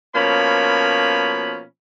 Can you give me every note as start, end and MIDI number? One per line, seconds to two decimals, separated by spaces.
0.15 1.63 47
0.15 1.63 53
0.15 1.63 58
0.15 1.63 61
0.15 1.63 73
0.15 1.63 83